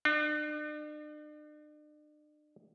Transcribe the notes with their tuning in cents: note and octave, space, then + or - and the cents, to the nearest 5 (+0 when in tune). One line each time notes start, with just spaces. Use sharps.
D4 +45